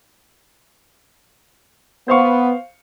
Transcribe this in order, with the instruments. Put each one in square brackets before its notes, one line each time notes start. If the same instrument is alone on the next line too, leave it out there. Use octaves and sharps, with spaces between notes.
[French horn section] B3 [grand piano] C5 F5 C#6